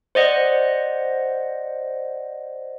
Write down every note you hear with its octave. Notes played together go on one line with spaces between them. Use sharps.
C5 D5 D#5 F#5